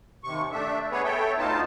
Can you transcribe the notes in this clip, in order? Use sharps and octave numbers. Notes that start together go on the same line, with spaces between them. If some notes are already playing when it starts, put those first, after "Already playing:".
D#2 C3 C#6
A3 D4 E5
B3 G#4 B4 C#5
A4 C#5 E5 G5
D2 B3 D#4 F4 A5